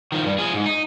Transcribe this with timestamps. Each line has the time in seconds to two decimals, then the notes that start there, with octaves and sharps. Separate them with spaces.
0.12 D#3 F3
0.26 G2
0.39 F3 G#4
0.54 G#2
0.66 D#4